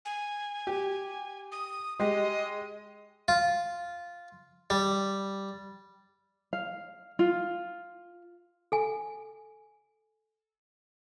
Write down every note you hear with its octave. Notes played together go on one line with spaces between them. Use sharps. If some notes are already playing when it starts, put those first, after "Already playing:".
G#5
G4
D#6
G#3 G4 D#5
F4
G3
F5
F4
A4 G#5